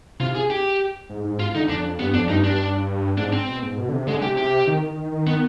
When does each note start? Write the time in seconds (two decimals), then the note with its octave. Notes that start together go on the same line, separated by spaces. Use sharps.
0.20 C3 F4
0.35 G#4
0.50 G4
1.09 G#2
1.24 G#2
1.40 F4
1.54 D3 D#4
1.69 F2 D4
2.00 G2 B3
2.14 F2 D4
2.29 G2 D#4
2.44 D4
3.18 G#2 D4
3.33 C4
3.48 B2
3.62 G#2
3.78 B2
3.89 D3
3.93 C3
4.08 D3 G#3
4.22 C3 G4
4.37 G4
4.67 D#3
4.83 D#3
4.97 D#3
5.12 D#3
5.27 D#3 B3